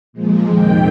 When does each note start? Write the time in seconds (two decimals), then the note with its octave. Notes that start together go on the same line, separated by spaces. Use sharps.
0.13 A#2 F3 G#3
0.46 F2 C3 D#3 G5